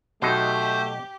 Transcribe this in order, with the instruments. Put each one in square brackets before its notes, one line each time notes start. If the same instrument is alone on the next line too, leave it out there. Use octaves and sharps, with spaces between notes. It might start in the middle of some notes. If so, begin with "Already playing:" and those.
[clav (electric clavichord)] B2 F#3 D#4 [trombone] A3 [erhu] G4 [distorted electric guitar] C5